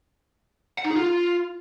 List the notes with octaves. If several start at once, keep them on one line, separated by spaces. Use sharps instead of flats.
F#5
D#4
G#4
F4